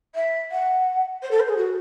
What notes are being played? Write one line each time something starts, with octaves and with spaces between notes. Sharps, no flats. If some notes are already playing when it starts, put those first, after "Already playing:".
E5
F#5
C5
A4
C5
G#4
F#4